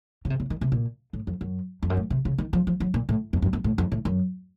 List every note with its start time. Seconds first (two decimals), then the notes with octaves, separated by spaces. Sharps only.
0.25 C#3
0.30 C3
0.40 C#3
0.50 D#3
0.61 C3
0.72 A#2
1.13 A2
1.27 F2
1.41 F#2
1.83 F2
1.90 F#2
1.97 A2
2.10 C3
2.25 C#3
2.38 D#3
2.53 F3
2.67 F3
2.80 F#3
2.94 A#2
3.09 A2
3.33 F2
3.42 F#2
3.53 F#2
3.64 A2
3.78 F2
3.92 A2
4.05 F#2